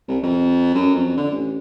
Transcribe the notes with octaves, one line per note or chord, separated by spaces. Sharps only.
C2
F2
F#2
F2
D3
A1